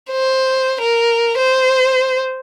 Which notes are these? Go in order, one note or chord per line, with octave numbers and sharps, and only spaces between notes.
C5
A#4
C5